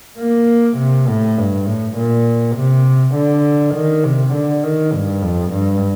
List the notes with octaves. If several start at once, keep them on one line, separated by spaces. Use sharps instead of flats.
A#3
C3
A2
G2
A2
A#2
C3
D3
D#3
C3
D3
D#3
G2
F2
G2